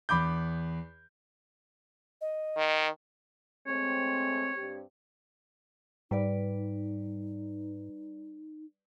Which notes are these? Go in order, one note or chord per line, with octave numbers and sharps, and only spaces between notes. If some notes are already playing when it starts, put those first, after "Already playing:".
E2 B5 D6 G6
D#5
D#3
G#3 A3 C4 C#5
G2 C4 G4
G#2 G3 D#4 B4 D5